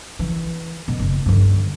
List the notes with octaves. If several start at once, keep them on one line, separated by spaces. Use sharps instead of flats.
E3
B2
F#1
G2 D3